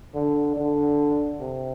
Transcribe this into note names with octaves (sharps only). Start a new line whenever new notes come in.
D3
D3
C3